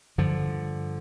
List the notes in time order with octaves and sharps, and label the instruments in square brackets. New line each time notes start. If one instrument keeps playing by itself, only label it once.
[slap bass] G2 D3 F3